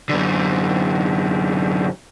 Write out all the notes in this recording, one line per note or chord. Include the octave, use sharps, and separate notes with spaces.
F#2 D3